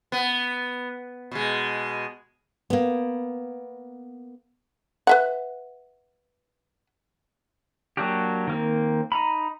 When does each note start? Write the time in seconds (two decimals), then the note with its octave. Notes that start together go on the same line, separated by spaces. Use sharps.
0.12 B3
1.32 B2 G#3
2.70 A#3 B3
5.07 B4 E5 F#5
7.97 F#3 A#3 D4 F#4 G4
8.47 D#3 A#3 C4
9.12 D#4 A#5 B5